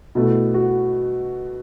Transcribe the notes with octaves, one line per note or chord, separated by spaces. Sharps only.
B2 A3 E4
F#4